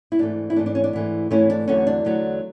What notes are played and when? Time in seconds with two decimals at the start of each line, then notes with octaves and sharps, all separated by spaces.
0.12 E4
0.19 G#2 E3 A3 D4
0.50 E4
0.56 G#2 E3 A3 D4
0.66 D4
0.75 C#4
0.84 D4
0.93 G#2 E3 A3
1.30 G#2 E3 A3 C#4 E4
1.50 D4
1.68 E2 D3 F#3 A3 C#4
1.87 D4
2.05 E2 D3 F#3 A3